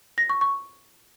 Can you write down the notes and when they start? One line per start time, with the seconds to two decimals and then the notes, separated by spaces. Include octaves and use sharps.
0.18 A#6
0.30 C#6
0.41 C#6